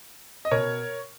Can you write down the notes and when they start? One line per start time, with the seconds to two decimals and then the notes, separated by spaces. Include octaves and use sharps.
0.45 D#5
0.51 B2 A#4 C#5